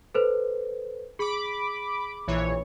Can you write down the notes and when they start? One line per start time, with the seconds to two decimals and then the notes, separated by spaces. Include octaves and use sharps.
0.15 A4 B4 C5
1.19 G#4 B5 D6
2.27 A#1 E3 C#5